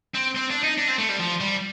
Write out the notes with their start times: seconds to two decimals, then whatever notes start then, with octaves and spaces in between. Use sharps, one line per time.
0.14 C4
0.35 C4
0.50 D4
0.63 D#4
0.78 D4
0.88 C4
0.99 A3
1.09 G3
1.20 F3
1.41 G3